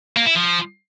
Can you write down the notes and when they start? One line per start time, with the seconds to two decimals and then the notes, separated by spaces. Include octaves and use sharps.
0.17 A#3
0.26 E4
0.36 F3